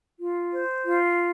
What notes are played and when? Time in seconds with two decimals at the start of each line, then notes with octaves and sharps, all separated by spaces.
0.18 F4
0.52 C5
0.86 F4